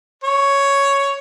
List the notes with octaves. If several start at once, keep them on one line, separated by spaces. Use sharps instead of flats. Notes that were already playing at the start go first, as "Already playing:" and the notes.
C#5